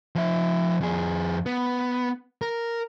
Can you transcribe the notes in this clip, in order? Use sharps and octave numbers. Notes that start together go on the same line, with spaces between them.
F3 E5
F2 G#4
B3
A#4